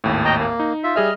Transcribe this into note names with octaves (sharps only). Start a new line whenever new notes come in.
G#1 D#2 A2
D#5 G5 A#5
A#3
D#4
F4 E5
G3 G#4 D#5 E5 F6